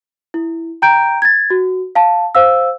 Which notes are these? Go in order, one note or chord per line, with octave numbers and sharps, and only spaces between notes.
E4
G5 A#5 G6 D7
G#6 A6
F#4
F5 A5
C5 F5 E6